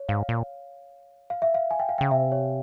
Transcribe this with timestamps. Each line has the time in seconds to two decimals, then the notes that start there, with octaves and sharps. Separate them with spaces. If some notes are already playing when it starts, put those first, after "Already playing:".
Already playing: C#5
0.09 G#2 F5
0.29 A#2
1.30 F5
1.42 E5
1.54 F5
1.71 G#5
1.79 G5
1.89 F5
1.98 C#3 G5
2.11 C3 E5
2.32 C#5